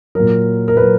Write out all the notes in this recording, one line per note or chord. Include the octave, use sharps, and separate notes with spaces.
A#2 F#3 A#4
A#4
A#2 F#3 B4